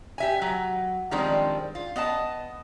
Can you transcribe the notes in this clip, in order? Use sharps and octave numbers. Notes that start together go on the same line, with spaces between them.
G4 E5 G#5
F#3
D#3 F3 G3 G#3 C4 D4
F4
B3 D#5 F5 A5